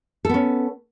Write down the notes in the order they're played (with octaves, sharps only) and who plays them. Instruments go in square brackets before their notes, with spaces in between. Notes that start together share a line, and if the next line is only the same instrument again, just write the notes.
[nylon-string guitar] A4
B3
C#4